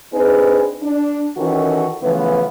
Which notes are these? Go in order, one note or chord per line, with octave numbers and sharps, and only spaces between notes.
C4 D4 D#4 G#4 B4
D4
D#3 E3 C#4 F#4 G4 A4
C#3 E3 F3 A3 B3 B4